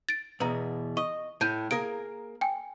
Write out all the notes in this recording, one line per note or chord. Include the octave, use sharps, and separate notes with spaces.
A6 D7
E2 B2 B4 A#5
D#5 C#6
A2 A5 G6 D#7
A#3 G#4 A#4 D7
G5 G#5